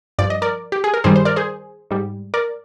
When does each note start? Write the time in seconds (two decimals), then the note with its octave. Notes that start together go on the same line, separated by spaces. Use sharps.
0.19 G2 F3 D5
0.30 D#5
0.42 A#4 D5
0.72 G4
0.84 G#4
0.94 A#4
1.04 G2 D#3 G3 G#4 C5
1.16 C5
1.25 A#4 D5
1.36 G#4 C5
1.91 G#2 G3
2.34 A#4 D5